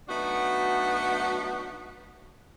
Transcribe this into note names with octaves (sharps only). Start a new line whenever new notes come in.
F#3 A3 B3 D4 D#4 F#4